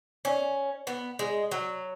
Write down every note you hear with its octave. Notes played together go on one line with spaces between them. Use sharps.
C#4
B3
G#3
F#3